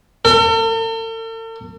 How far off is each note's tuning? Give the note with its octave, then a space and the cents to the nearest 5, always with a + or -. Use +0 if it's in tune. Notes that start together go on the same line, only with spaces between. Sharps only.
A4 +45